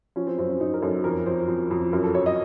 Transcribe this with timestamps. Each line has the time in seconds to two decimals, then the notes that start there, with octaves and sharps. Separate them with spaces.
0.16 F3 C#4
0.27 C4
0.38 F#2 C4
0.49 C#4
0.60 F#2 D#4
0.74 A#4
0.82 F#2 A4
1.04 F2 A#4
1.26 F2 C5
1.48 F2
1.71 F2
1.93 F#2 A#4
2.04 A4
2.15 F#2 C#5
2.26 D#5